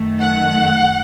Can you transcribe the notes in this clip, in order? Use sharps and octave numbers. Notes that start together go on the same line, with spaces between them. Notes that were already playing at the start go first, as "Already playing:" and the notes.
Already playing: F#2 D#3 A3
F#5